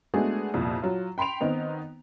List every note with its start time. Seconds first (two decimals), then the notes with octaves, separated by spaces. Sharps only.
0.14 G#3 A3 B3 D4 F#4 G#4
0.54 C2 F2 A#2
0.82 F#3 F4
1.18 G5 B5 C6 D7 F7
1.41 D#3 B3 C4 D#4